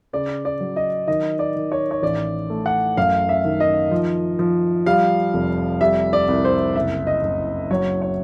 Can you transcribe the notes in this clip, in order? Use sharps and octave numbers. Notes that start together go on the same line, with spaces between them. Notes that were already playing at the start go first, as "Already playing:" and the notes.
C#3 D5
D5
F#3
D#5
D#3 D#5
D5
D#3
C#5
C#5
A1 D5
A3
F#5
F#2 F5
E5
D#3
D#5
F3
F3
G3 F5
F1
G3 E5
D5
C2
C5
F#1 E5
D#5
F#1
F#3 C#5
C#5